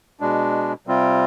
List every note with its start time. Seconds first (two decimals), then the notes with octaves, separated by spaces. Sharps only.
0.20 B2 G#3 D4
0.87 C3 G3 C4 F4